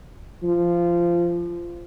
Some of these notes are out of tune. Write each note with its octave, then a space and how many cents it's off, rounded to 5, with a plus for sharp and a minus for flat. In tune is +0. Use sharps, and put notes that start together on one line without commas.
F3 -15